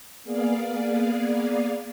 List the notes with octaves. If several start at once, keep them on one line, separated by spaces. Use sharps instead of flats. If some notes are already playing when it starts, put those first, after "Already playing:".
A#3 B3 G#4 D5 F5